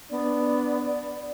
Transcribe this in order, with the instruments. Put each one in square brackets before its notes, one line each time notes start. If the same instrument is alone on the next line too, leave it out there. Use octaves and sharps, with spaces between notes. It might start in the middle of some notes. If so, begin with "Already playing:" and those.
[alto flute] B3 [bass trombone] D4 [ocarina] D5